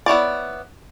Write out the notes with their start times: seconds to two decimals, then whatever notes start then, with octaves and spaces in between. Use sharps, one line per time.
0.06 B3 E4 C#5 D5